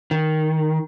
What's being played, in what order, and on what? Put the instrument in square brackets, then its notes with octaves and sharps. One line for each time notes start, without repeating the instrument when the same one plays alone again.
[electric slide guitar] D#3